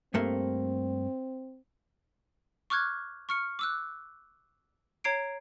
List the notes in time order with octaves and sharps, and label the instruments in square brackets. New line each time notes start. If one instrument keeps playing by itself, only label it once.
[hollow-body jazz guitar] G2 A3 A#3 [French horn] C4
[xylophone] C#6 D6 F6 F#6 G#6
C#6 F6 C#7
D6 E6 F#6
C#5 A#5 G#6 C7 D7